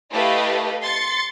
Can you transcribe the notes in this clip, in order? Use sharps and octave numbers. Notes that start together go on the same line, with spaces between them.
A3 E4 G4 B4 D#5 F5
C6 A6 C#7